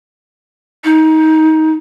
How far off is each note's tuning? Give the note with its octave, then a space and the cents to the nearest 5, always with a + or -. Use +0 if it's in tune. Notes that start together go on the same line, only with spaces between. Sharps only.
D#4 +20